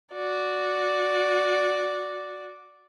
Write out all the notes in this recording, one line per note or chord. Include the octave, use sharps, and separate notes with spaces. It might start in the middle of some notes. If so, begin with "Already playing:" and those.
F#4 D5